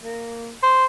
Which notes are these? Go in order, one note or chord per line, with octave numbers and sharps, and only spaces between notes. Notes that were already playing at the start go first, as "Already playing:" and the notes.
A#3
C5